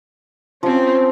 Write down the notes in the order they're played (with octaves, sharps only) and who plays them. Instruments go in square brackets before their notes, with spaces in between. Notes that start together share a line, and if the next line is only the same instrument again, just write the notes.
[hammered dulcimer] F3 [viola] C4 C#4